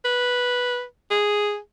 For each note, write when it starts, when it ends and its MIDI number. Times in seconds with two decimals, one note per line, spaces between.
0.05 0.83 71
1.11 1.58 68